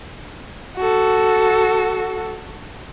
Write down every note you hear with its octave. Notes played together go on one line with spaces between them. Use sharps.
F#4 A4